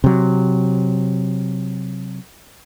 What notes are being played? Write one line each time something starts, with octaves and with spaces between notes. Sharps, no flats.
C3 F#3